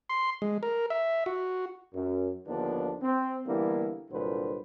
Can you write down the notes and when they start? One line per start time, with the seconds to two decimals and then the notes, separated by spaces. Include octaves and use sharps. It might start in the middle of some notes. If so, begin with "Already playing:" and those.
0.10 C6
0.42 G#3
0.63 A#4
0.90 E5
1.26 F#4
1.94 F#2
2.47 D#2 D3 F3 B3 D4
3.02 C4
3.47 D3 E3 G3 A#3 B3 E4
4.11 C2 A#2 D3 F#3 B4 C5